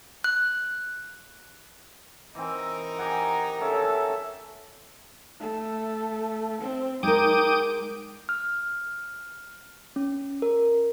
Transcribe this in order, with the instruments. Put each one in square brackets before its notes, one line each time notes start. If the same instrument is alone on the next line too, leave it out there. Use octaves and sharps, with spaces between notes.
[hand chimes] F#6
[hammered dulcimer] E3 C4 [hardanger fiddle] D#4 A#4
[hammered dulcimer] G4 G#4 F#5
[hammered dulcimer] C#4 [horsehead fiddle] A4 E5
[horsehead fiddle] A3
C4
[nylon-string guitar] G#3 A#4 [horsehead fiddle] D#4 [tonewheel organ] G5 D6 D#6
[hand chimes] F6
C#4
A#4